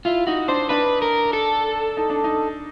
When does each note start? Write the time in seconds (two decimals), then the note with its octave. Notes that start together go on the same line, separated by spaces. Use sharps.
0.06 E4 F4
0.27 D#4 F#4
0.48 D4 C5
0.69 D4 B4
1.02 A#4
1.33 A4
1.97 D#4
2.10 D4
2.24 D#4